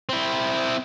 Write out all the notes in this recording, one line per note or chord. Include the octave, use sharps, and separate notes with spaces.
C4 E4